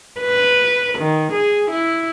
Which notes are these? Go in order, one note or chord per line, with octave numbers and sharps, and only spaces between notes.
B4
D#3
G#4
E4